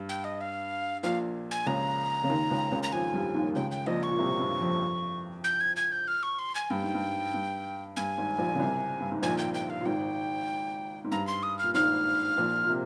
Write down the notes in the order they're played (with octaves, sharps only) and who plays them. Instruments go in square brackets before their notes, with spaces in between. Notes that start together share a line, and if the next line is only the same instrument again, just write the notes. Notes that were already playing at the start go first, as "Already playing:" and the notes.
Already playing: [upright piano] G2
[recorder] G5
D#5
F5
[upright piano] A#1 A#2 [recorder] F5
[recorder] G#5
[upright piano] C#2 C#3 [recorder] A#5
[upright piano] C#3
D#2 D#3
C#2 C#3
C#2 C#3
[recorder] A#5
[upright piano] F2 F3 [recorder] G#5
[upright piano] G2 G3
D#2 D#3
[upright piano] C#2 C#3 [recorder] G5
[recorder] G5
[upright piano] A#1 A#2 [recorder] D#5
[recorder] C#6
[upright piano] A#2
C2 C3
G2
F2
[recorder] G6
G#6
G#6
G6
F6
C#6
C6
G#5
[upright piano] G2 [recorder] G5
[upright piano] G#2
G2
G2
[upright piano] G2 [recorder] G#5
[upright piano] G#1 G#2
A#1 A#2
C#3
C2 C3
G2
G#2
[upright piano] A#1 A#2 [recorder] G#5
[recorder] G5
G5
F5
[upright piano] A#2
[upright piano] G#1 G#2 [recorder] G5
[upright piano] G#2
[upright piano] G2 [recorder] A#5
[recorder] C6
D#6
[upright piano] A#2 [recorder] F6
[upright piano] G#1 G#2 [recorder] F6
[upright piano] A#1 A#2
A#2
C3